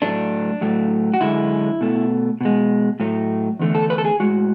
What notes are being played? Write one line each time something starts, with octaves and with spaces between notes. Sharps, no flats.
A2 F#3 A3 D4
A2 F#3 A3
F#4
F#2 D3 G#3 E4
B2 A3
B2 G#3
A2 F#3 A3
E2 D3 A3
A4
B4
A4
G#4
A2 G#3 F#4